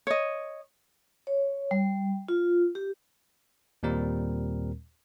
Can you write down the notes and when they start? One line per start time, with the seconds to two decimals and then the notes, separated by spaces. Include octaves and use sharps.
0.07 C#5 D#5
1.27 C#5
1.71 G3
2.29 F4
2.75 G4
3.83 D#2 A#2 G3 C4 A#4